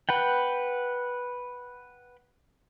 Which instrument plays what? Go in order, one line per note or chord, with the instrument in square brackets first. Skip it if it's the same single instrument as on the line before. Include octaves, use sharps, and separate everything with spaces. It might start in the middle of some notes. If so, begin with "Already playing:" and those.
[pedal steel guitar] B4 F#5 G5